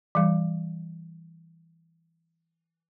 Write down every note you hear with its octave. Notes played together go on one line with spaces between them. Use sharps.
E3 G3